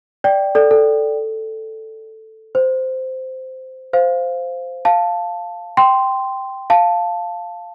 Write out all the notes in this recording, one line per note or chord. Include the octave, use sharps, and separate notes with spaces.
D5 G5
A4 D5
A4
C5
C5 F5
F5 A5
G5 C6
F5 A5